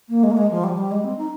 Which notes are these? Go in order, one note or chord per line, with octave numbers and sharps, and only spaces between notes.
A#3
G#3
A#3
G#3
F3
G3
F3
G3
G#3
C4
D#4